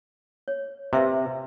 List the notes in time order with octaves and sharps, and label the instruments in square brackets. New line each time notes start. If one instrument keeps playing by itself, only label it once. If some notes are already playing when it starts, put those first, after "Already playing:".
[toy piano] C#5
[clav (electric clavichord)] C3 [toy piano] B4 E5 F5